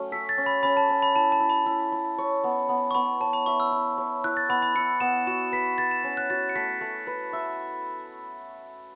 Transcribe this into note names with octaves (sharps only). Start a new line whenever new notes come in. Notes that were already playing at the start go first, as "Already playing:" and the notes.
Already playing: F#3 A3 C#4
A4 B6
A6
C#4
B5
C#4 B5
A5
C#4
B5
E4 A5
A5
E4
B5
E4
E4
C#5
B3
B3
C#6
B3 B5
C#5 A5
B5
E5 C#6
E6
E4
C#5
E4 F#6
A6
B3 B5
B5
E4 C#7
B3 E7
F#4 E7
B4 B6
B4 A6
E7
C#4
F#6
F#4 A6
C#7
A3 B6
A3
B4
E5